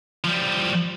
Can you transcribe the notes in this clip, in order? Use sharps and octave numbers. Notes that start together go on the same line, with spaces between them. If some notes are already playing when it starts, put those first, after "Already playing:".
F3 G3